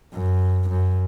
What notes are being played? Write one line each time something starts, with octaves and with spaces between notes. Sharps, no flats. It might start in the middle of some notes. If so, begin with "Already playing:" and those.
F#2
F#2